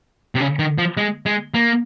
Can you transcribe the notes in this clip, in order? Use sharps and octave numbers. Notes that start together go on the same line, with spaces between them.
C3
C#3
D#3
F3
G#3
G#3
A#3